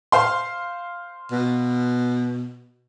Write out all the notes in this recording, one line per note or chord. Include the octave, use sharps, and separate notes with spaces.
C5 F5 C6
B2